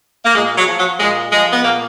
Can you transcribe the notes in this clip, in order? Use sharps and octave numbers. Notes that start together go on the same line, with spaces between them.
A#3
A#2 G#3
F#3
F3
F#3
A#2 G#3
F3 G#3
B3
A#2 A#3